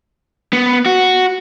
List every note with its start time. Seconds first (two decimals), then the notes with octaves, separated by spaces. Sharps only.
0.53 B3
0.86 F#4